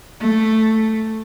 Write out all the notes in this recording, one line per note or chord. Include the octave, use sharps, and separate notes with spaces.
A3